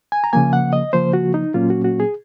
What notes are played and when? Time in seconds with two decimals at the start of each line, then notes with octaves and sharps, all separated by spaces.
0.12 G#5
0.24 A#5
0.33 C#3 F3 A#3 G#5
0.53 F#5
0.73 D#5
0.93 C#3 F3 A#3 C5
1.13 F#4
1.34 D#4
1.54 A#2 F#3 A#3 C#4 F4
1.70 F#4
1.85 F#4
2.00 G#4